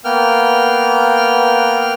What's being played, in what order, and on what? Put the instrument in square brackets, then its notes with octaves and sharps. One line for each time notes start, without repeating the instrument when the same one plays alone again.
[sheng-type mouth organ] A#3 B3 G5 F6